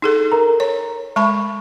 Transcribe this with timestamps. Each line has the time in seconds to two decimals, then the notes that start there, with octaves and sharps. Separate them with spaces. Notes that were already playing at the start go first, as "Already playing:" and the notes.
0.02 D#4 G#4 A4
0.32 A#4 A#5
0.60 C#5
1.16 G#3 A5 B5 C#6